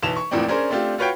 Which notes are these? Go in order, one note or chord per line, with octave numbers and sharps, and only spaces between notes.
B1 E3 A5 E7 F7
C#6
E2 A2 F3 A#3 C4 D4
C#4 D4 G#4 A#4 C5
A3 C4 D4 F4 G4
F4 F#4 B4 C#5 F5 G5